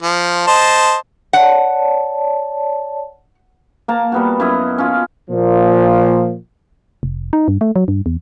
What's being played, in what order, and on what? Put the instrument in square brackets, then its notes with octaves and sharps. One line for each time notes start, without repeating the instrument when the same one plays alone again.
[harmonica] F3
C5 D#5 A5
[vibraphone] C#5 D5 A5 [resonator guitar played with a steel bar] F#5
[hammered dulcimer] A#3 A5 A#5
G3 B3 F#4
F#2 E4 D#5
C#4 F4
[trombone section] A#2 F3
[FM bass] F1
D#4
G2
A3
F#3
G2
E2